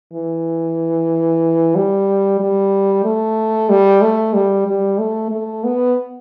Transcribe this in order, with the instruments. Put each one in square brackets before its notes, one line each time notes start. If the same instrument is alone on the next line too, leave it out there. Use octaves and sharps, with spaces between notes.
[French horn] E3
G3
G3
A3
G3
A3
G3
G3
A3
A3
B3